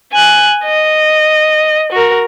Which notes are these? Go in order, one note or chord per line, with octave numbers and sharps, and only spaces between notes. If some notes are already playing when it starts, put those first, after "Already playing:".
G#5 F#6
D#5
F#4 A#4